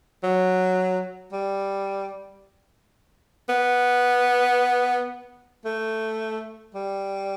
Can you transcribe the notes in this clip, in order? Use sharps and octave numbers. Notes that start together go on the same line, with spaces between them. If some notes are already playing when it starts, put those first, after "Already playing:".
F#3
G3
B3
A3
G3